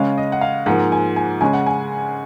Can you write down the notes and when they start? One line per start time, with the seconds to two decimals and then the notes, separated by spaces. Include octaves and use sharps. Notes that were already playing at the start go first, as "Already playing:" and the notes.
Already playing: C#3 G#3 C#4 F5
0.18 D#5
0.32 F#5
0.41 F5
0.66 G#2 F3 A#3 F#5
0.92 G#5
1.16 G#5
1.41 C#3 G#3 C#4 G#5
1.53 F#5
1.66 G#5